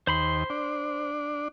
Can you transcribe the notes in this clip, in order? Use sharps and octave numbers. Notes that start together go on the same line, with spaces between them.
D#2 C5 B5 C6
D4